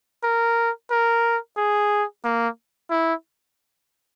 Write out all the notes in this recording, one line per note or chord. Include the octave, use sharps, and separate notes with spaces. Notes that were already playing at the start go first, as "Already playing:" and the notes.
A#4
A#4
G#4
A#3
E4